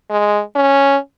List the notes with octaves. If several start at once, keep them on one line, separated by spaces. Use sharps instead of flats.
G#3
C#4